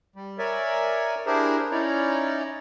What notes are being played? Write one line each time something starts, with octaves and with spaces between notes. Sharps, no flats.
G3
A#4 C#5 D5 E5 G#5
D4 E4 G4 G#4 A#4 C5
C#4 D#4 E4 C#5 D5 A#5